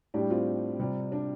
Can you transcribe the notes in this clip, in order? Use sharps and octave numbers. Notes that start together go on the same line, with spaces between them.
A2 G3 D4 G4
C4 F4
C3 G3
D4